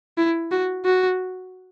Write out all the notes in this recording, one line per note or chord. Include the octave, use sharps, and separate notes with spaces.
E4
F#4
F#4